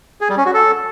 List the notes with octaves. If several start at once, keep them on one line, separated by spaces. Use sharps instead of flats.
G#4
G3
C#4
F#4
A4